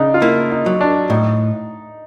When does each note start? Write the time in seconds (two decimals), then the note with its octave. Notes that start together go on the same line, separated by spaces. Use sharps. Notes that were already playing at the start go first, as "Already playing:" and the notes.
Already playing: C#3 D4 D#4
0.14 F4
0.22 A#3 E4
0.51 D#4
0.66 F#3
0.81 D4
1.10 A2 D#4